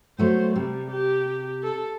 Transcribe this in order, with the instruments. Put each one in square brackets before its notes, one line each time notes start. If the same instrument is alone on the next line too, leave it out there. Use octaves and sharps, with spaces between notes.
[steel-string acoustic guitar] F#3 A3 B3 [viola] C5
[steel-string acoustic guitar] C3 [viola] G3
[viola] G4
A4